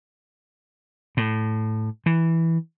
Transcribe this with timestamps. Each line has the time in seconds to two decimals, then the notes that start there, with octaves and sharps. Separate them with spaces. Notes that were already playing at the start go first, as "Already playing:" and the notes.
1.17 A2
2.06 E3